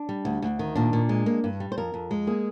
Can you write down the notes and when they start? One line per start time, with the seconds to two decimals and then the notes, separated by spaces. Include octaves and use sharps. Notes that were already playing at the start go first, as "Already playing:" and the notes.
Already playing: D4
0.09 G3
0.25 D2
0.42 D2
0.59 D#3
0.75 A#2 D4
0.93 A#2
1.09 G#3
1.26 A#3
1.44 G2
1.60 G3
1.72 C5
1.78 F2 A#4
1.94 F2
2.11 G#3
2.27 A#3 G#4